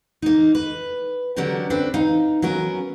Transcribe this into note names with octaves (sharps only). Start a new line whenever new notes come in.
A#3 D#4
B4
D3 F#3 C#4 D4 G4 A#4
C4 D4 B4
D#4 F5
F#3 B3 C#4 A#4